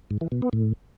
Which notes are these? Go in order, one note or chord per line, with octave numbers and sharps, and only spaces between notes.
G#2
E3
B2
B3
A2